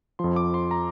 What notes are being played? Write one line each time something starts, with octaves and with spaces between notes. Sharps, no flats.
F2 F3 C6
D6
C6
A#5